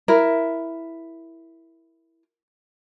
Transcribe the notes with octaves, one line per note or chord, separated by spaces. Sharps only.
E4 A#4